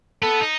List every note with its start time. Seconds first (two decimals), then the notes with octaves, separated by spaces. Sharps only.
0.22 B3 A4
0.42 D#4